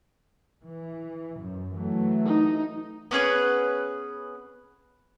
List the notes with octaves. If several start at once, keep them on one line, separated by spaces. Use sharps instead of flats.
E3
F#2
E3 F#3 A3
D#4
B3 C#4 G#4 B4